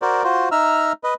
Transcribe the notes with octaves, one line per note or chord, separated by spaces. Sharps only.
F#4 A#4 C5 D5
F4 F#4 C5
D#4 E5 A#5 E6 F6
B4 D#5